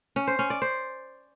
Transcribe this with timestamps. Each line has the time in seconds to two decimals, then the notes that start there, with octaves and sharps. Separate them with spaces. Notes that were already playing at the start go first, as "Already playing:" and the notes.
0.16 C#4
0.27 C5
0.39 C#4
0.50 D5
0.62 C5